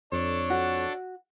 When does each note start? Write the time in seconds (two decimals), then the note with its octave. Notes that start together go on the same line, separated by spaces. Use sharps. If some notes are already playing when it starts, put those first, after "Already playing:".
0.12 F2 D4 A4 C#5
0.50 F#4